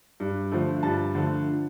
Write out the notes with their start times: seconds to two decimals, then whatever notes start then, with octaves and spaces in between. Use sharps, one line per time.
0.20 G2
0.52 D3 F3 A3
0.83 G2 A5
1.15 D3 F3 A3